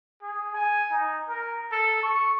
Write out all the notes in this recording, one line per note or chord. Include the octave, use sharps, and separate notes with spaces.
G#4
G#5
D#4
A#4
A4
C#6